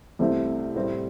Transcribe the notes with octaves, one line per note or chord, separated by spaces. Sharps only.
C2 C3 A3 C4 E4
A2 G3 C4 E4